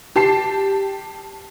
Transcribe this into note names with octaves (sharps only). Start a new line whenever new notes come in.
G4 A5 C7